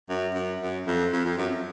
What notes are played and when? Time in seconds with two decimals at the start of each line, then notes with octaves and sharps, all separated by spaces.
0.09 F#2
0.34 F#2
0.60 F#2
0.87 F2
1.13 F2
1.25 F2
1.37 F#2